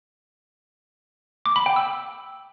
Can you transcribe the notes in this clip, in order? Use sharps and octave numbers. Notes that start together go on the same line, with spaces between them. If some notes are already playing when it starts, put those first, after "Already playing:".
D6
B5
G5
E6